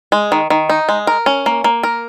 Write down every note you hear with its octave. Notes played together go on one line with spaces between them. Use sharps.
G#3
D#3
D#3
D#4
G#3
A#4
C#4
A#3
A#3
A#4